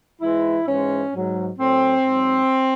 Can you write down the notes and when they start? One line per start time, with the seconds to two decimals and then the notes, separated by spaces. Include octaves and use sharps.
0.21 G#2 E3 G#3 E4
0.66 G#2 E3 G#3 C#4
1.12 G#2 F#3
1.58 A2 F#3 C4
2.04 G#2 F#3